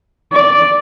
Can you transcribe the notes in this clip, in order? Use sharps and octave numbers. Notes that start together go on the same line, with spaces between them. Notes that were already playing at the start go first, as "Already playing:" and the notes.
D5